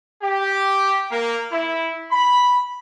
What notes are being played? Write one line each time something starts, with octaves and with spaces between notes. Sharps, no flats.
G4
A#3
E4
B5